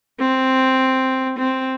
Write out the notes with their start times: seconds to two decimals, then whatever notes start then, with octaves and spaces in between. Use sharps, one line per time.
0.19 C4
1.39 C4